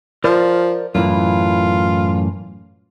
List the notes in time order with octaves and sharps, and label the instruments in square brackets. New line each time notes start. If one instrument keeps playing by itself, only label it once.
[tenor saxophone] F3 [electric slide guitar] A#4 C5 D5
[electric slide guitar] F#2 A2 E3 [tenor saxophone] F4